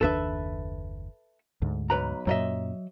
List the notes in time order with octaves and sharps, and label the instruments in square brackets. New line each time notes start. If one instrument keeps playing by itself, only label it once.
[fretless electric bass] F#1 D#2 D4 [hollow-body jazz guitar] A4 B4 E5
[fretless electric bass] D2 G#2
[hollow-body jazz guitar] B1 B4 A#5
[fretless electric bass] F#2 A#2 [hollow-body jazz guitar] F#3 D#5 E5